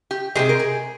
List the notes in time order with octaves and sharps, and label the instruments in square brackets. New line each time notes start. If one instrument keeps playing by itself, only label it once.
[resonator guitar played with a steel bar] G4
[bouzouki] C3 D#3 G#3 [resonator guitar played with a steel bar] G4
[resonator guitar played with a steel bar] A#4
G#4